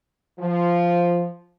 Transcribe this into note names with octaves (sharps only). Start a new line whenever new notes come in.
F3